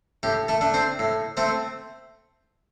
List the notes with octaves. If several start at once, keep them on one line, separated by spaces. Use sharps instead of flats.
A2 G4
A3 A4
A3 D4
C4 C5
A2
A3 C4 C5